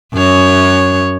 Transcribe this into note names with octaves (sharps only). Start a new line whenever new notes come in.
F#2 C#5